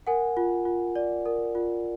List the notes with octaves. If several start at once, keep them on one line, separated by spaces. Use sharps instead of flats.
A#4 F#5 G#5
F4
F4
D5
A#4
F4